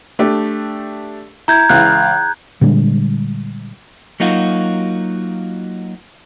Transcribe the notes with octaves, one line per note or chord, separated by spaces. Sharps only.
A3 D4 G4
E4 A#5 G6 G#6
C#2 E3 F5 F#6
A#2 D3 G3 G#3
F#3 A#3 D#4 F4 F#4